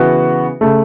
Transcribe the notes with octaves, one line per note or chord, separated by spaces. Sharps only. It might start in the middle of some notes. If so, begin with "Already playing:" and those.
Already playing: C#3 E3 B3 F#4
C#3 A3